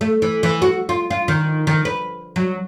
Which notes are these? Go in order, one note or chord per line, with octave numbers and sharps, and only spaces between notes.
A3
E3
E3
F#4
F4
F4
D#3
D#3
B4
F#3